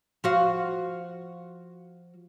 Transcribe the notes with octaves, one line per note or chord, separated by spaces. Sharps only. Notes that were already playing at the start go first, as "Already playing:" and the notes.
F3 F#4 F5